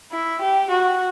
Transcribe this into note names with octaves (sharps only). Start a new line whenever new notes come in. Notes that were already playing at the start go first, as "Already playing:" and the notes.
E4
G4
F#4